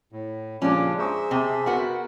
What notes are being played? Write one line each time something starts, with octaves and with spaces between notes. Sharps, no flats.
A2
A#2 C#3 F3 G#3 C#4 D4 F4 G4
G#4 C5 E5 A#5 C#6 D#6
C3 G5 A5
B3 F#4 A#4